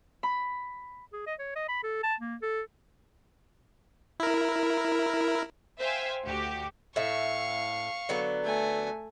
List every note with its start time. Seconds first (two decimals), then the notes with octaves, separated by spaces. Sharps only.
0.23 B5
1.13 G#4
1.27 D#5
1.39 C#5
1.56 D#5
1.69 B5
1.84 A4
2.03 A5
2.20 A#3
2.42 A4
4.20 E4 A#4
5.79 C5 E5 F5 G5 G#5
6.25 D2 F#4 G4
6.96 A2 E5 F5 C#6
8.09 D3 F#3 B3
8.43 A3 G#5